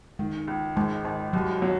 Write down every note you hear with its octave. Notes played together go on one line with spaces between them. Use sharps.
D#3 G#3
C#2
G#1 G#3
G#1
C2 F#3
F#3